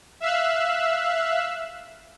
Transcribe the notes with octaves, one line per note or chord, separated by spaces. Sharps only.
E5 F5 E6 F#6